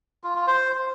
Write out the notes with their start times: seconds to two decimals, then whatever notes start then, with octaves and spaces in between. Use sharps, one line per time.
0.24 F4
0.35 F4
0.47 C5